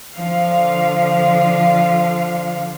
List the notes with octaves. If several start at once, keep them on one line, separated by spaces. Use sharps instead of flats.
D3 F3 F5